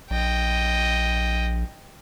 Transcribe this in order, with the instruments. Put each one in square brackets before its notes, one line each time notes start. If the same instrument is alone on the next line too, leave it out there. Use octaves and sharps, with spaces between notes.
[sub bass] A#1 [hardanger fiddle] D#5 G5